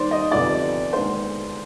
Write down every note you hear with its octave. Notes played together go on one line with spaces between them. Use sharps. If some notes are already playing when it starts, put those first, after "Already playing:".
Already playing: D#2 D#3 G3 C5 D5
D#5
D2 C3 F3 B3 D5
D#2 D3 G#3 B3 C5